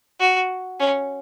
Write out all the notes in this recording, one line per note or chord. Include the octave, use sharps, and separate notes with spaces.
F#4
C#4